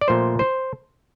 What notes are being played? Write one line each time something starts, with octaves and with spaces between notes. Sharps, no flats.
D5
A#2 F3 A3 C5
C5